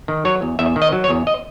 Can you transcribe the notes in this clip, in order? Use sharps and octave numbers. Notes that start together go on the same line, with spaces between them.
D#3
F#3 C#5
E2
E2 E5
D#3
D#5
F#3
C#5
E2
D#5